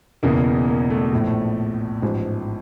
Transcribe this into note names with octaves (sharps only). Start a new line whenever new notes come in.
E1 E2 C#3 E3 A#3
A#3
A3
A#1 A2 F3
A1 G#2 F3 G#3